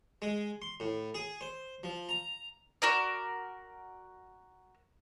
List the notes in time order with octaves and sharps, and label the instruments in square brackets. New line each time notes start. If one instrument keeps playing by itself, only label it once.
[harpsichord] G#3
C6
A2
G#4
C5
F3
A#5
[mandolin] F#4 A#4 D5